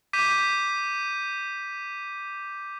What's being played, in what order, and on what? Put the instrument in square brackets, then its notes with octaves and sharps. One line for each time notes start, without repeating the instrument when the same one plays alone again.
[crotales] D6 G6 B6 D#7